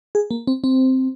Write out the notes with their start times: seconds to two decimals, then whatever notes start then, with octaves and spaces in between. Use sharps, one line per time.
0.15 G#4
0.31 A#3
0.47 C4
0.64 C4